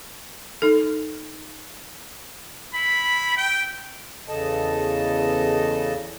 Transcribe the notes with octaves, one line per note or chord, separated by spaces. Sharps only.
D#4 A4
E4 B5
G5
E2 C#3 A4 D#5 A5